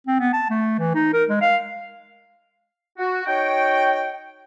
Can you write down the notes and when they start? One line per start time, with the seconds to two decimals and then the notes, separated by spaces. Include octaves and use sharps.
0.07 C4
0.20 B3
0.33 A5
0.50 A3
0.79 E3
0.95 D#4
1.13 A#4
1.29 G#3
1.41 F5
2.98 F#4
3.26 D#4 F#4 C#5 G5